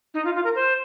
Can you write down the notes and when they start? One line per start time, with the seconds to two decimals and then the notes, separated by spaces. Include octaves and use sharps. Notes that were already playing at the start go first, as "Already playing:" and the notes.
0.14 D#4
0.25 F4
0.35 F4
0.44 A#4
0.55 C5